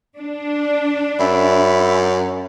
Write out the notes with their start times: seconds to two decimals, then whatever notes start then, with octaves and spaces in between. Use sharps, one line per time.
0.18 D4
1.20 F#2 E5 B5